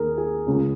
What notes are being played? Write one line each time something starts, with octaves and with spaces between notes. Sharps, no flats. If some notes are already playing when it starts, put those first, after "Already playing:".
Already playing: D#2 D#3 G#4 A#4
G#4
C#2 C#3